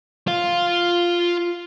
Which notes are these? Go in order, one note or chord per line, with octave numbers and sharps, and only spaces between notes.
F4 F5